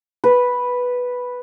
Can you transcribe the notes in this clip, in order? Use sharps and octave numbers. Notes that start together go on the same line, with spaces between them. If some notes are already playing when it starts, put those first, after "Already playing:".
B4